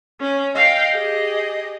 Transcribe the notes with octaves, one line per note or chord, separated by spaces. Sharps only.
C#4
D#5 F5 G5
G4 G#4